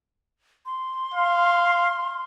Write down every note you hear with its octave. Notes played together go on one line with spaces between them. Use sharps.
C6
F5